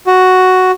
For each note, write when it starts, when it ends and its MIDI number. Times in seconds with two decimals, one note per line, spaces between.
0.07 0.71 66